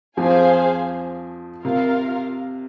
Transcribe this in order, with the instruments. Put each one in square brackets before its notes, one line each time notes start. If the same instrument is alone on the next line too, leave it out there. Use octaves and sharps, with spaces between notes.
[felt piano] F2 F3 [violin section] G#4 C5 F5 G#5
[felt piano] C3 [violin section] F4 A#4 F5